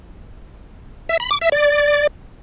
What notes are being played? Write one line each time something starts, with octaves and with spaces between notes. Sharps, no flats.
E5
B5
D6
E5
D5